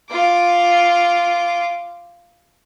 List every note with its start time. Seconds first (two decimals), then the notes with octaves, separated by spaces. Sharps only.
0.11 F4 D6